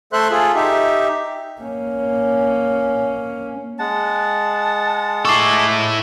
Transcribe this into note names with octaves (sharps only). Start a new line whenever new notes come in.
A3 A4 C5 E5 C6 F#6
F4 G#4 A4
D#4 G4 E5
A#3 C#4
G#3 F#5 A5
E4 A4 C#6 D6 C7